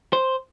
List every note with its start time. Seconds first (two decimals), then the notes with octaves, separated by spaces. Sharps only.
0.13 C5